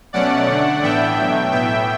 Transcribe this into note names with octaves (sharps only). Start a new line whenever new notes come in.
B2 F#3 A3 C#4 D5 F#5
D3 A3 D4
A2 E3 B3 D4 E5 G5
B2 F#3 A3
A2 E3 B3 E5 G5